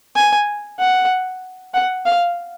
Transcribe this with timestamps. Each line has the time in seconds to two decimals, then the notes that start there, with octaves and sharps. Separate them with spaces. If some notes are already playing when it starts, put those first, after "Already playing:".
0.16 G#5
0.79 F#5
1.74 F#5
2.05 F5